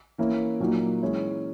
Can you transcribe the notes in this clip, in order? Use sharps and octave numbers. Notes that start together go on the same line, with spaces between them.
E3 A#3 C#4 E4
A#2 F#3 A#3 D#4
E3 G#3 C#4 E4